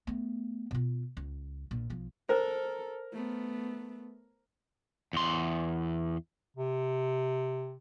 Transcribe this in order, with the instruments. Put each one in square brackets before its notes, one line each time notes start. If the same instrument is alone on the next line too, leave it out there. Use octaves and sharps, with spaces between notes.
[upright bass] A3 B3
B2 F4
C#2
A#1 A#2
B1 F3
[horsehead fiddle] A4 [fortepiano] A#4 [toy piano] C5
[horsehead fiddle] A3 B3
[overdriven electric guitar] E2 C6
[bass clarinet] C3